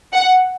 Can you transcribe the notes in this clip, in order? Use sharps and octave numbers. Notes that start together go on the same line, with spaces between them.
F#5